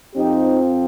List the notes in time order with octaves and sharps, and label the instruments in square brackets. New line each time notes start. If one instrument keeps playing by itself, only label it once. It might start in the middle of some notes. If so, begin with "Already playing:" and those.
[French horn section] F2 F3 C4 D#4 G4